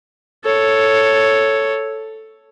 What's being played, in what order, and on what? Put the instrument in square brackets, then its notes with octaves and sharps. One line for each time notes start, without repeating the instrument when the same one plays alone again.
[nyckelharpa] A4 C#5